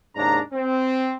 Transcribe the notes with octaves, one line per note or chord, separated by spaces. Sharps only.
D#2 G#2 C#3 D4 A#5
C4